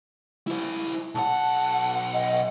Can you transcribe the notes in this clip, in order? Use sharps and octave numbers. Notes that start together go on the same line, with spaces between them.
E4 C5
B1 F#5 A5
D#5